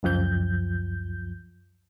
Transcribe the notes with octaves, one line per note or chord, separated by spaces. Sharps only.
C#2 F#2 F3 G6